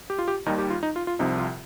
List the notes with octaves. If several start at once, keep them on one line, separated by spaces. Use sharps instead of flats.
G4
F4
G4
D#2 D#3 G3 D#4
G4
F4
D#4
F4
F4
C2 C3 F3 D#4
F4